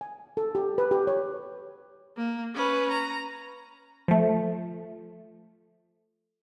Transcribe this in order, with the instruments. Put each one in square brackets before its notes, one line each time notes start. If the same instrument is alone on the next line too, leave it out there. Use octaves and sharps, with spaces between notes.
[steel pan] G#5
A4
G4
B4
G4
C#5
[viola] A#3
C#4 B4
A#5
[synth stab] F3 A3